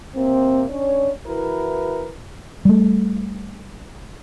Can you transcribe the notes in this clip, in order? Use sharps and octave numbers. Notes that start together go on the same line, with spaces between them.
C3 A#3 C4
C#4 D4 C#5
E3 E4 F#4 A#4 B4
G3 A3